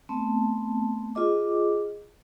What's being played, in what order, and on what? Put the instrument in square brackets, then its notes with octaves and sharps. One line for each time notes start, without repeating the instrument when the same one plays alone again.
[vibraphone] A3 B3 C4 A5
F4 G#4 D#5 D6